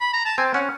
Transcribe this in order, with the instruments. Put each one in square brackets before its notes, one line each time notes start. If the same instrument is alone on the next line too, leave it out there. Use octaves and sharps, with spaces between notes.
[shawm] B5
A#5
A5
[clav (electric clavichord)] C4 [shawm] G#5
[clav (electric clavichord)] C#4 [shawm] F#5